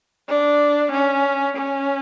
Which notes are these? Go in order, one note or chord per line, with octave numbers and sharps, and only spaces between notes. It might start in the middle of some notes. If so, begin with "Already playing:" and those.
D4
C#4
C#4